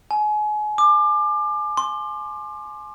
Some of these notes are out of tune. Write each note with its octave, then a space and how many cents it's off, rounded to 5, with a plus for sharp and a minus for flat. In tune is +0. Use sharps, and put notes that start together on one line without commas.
G#5 +30
D6 +30
C6 +20